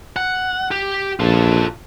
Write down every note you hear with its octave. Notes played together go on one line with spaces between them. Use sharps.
F#5
G4
A#1 F4 A4